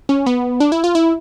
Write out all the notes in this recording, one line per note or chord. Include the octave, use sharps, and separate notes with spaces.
C#4
B3
D4
E4
F4
E4